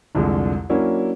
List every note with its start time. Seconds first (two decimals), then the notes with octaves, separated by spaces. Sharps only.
0.15 C2 F2 D3 G#3
0.69 F#3 A#3 C#4 D4 E4 F#4